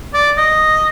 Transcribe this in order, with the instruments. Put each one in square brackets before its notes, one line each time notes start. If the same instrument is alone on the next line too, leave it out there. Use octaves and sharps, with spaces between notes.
[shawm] D5
D#5